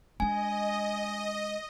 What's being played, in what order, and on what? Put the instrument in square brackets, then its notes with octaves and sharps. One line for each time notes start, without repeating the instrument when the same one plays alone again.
[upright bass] G#3 D4 [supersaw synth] D#5 [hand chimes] G#5